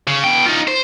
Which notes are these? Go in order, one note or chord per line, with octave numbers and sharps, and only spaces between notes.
C#3
B2 G5
D#4 F4
C5